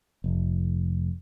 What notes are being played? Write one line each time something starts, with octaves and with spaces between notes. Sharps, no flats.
F1